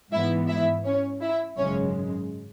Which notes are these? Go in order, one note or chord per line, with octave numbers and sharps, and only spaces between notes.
G#2 E3 B3 E4 E5
E4 E5
C#4 C#5
E4 E5
G#1 F#2 C#3 G#3 C#4 C#5